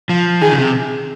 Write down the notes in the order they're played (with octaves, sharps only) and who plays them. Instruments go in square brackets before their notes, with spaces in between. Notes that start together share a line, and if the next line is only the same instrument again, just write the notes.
[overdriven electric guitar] F3
[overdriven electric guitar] D#3 [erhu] G#4
[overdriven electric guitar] C#3
C3